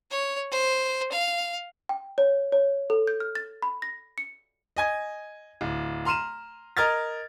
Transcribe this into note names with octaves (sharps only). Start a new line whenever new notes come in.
C#5
C5
F5
G5
C#5
C#5
A4
G6
F6
A6
B5
A#6
C#7
D#5 G#5 G#6
D1
A#5 C6 F6 D#7 E7
A#4 D#5 F6 G#6 A6